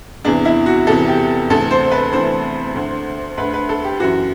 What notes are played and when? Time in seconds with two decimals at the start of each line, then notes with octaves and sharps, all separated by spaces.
0.25 E2 C3 E3 D4
0.45 E4
0.66 F#4
0.87 E2 C3 E3 A4
1.08 G4
1.50 D2 C3 E3 A4
1.71 C5
1.91 B4
2.12 D2 C3 E3 C5
2.75 D2 D3
3.37 D2 D3 B4
3.54 B4
3.69 A4
3.84 G4
4.00 F#2 E3 F#4